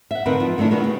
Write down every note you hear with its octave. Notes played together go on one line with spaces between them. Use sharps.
E5 F#5
D3 C4 D4 D#4 A#4 B4
F3
D#3 A3 C#4 D4 E4
A#2 D#3 B3 F#4
C#3